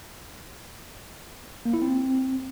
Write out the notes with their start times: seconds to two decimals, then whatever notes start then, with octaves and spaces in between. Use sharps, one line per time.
1.65 A#3
1.74 E4
1.82 C4